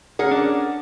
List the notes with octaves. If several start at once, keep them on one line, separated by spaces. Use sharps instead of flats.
C#4 G#4 A#4 F#5
D4